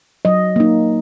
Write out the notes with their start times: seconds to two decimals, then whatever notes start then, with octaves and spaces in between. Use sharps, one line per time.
0.25 F#3 D#5
0.56 A#3 D#4